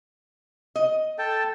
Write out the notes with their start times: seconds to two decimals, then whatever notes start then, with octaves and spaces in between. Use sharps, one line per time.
0.76 D#5
1.18 A4 G5 A5